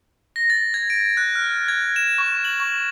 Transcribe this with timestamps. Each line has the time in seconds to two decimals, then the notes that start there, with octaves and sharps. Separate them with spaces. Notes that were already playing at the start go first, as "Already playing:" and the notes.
0.36 A#6
0.50 A6
0.74 G#6
0.90 D7
1.17 F#6
1.35 F6
1.68 G#6
1.96 E7
2.18 C#6
2.45 F#7
2.60 C#6